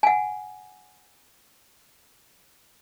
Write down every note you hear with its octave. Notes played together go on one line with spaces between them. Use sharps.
F#5 G#5